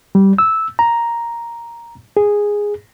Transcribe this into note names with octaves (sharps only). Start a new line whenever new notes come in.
G3
E6
A#5
G#4